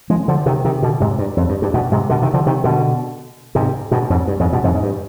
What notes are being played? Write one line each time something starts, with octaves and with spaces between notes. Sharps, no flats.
F3 G#3
D3 F3
C3 D#3
C3 D#3
B2 D3
G#2 C3
G2
F2
G2
G2
G2 B2
G#2 C3
B2 D3
C3 D#3
D3 F3
C3 D#3
B2 D3
G#2 C3
G2 B2
F2 G#2
G2
F2 G#2
G2 B2
F2 G#2
G#2
G2